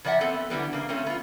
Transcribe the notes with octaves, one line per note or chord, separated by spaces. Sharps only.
C#3 F3 D5 E5 F#5
B3 C4 A4
D3 E3 G3 B3
C#3 A#3
G#3 A3 C4 C#4
B3 F4